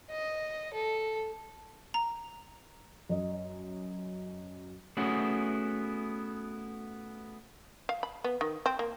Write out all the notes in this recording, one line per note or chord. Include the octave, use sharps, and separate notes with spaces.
D#5
A4
A#5
F#2 D#5
A3 B3 C#4 E4 F#4 G#4
F5
B5
B3
D#3
C4
A#3